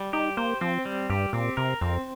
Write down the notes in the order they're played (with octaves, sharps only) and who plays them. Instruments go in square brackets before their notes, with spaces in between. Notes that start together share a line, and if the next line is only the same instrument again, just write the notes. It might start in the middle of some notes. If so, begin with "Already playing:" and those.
Already playing: [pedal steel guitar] G3
[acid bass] D#4 [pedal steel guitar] G4
[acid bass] A#3 [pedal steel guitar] C5
[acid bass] F3 [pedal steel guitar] C4
[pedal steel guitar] G3
[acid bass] G2 [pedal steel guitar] G4
[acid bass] A#2 [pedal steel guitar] C4
[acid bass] C3 [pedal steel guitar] A#4
[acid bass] F2 [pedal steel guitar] C4